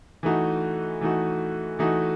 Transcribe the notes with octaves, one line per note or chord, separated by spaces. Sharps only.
E3 A3 D#4 F#4
E3 A3 D#4 F#4
E3 A3 D#4 F#4